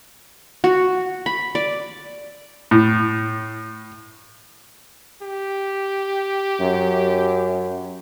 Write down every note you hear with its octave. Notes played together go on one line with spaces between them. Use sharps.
F#4
B5
D5
A2
G4
F#2